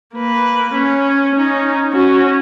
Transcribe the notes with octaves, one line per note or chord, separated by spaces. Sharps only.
A#3 B4
C#4
C#4 D#4
C#4 F#4